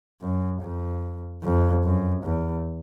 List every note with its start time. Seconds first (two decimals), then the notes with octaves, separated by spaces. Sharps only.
0.21 F#2
0.62 F2
1.43 F2
1.84 F#2
2.24 E2